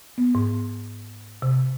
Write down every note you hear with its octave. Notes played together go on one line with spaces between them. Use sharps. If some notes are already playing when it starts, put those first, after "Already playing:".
B3
G#2
C3